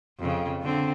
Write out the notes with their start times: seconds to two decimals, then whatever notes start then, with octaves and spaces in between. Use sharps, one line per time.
0.19 F2 C#3
0.61 D3 C4